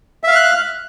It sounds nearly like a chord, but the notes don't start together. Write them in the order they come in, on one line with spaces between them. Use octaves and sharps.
E5 F5 F6 F#6